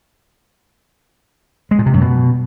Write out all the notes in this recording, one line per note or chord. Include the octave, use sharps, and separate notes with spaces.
G#3
A#2
C3
F#2
B2